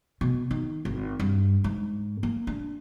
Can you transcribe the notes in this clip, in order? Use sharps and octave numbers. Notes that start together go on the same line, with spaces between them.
B2
D#3
G#1
G2
G#2
A#3
D4